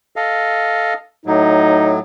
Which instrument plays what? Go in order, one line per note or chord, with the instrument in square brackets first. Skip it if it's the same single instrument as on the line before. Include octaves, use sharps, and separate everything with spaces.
[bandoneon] A4 D#5 F5
[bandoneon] A2 F#3 [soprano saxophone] D#4